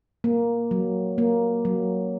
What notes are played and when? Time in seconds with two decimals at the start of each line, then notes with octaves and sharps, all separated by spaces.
0.24 A#3
0.71 F#3
1.18 A#3
1.65 F#3